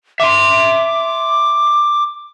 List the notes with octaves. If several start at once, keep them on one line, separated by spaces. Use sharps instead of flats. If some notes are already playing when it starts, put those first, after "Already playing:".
E5 C6 D6